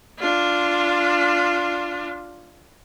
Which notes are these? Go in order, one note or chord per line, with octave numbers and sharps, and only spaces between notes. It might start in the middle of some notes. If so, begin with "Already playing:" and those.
D4 F4